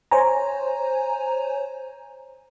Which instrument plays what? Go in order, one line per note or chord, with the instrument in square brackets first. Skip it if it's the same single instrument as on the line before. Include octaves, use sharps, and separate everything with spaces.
[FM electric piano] C5 C#5 G#5 A#5